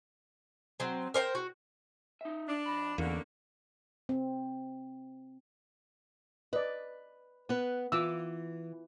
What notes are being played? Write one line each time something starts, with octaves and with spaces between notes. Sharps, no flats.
F#3 C4
A#4 C5 F#5 G5
F#4
D#4 E5
D4
F2 B5
B1 E2 D3 A#3 C#4
C4
B4 D5 D#5
B3 B4
E3 F4 D6 E6